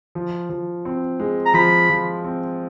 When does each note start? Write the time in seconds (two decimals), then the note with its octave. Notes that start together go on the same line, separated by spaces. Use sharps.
0.15 F3
0.50 F3
0.85 C4
1.20 G#3
1.45 A#5
1.54 F3 B5
1.90 F3
2.25 C4